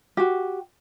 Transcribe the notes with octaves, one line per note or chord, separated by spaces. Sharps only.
F#4 G4